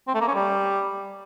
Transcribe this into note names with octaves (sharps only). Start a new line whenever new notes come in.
C4
A3
A#3
C#4
G3